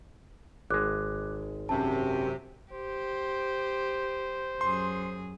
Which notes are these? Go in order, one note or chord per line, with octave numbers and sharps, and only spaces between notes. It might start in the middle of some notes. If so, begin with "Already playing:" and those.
G#1 G#3 D6 F#6
F#2 C3 A5
G4 C5
F#2 G#4 C6